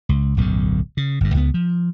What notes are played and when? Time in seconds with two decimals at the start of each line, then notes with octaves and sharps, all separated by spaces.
0.09 C#2
0.37 D1 B1 F#2 D3
0.97 C#3
1.21 G1 G2
1.34 C#2 B3
1.54 F3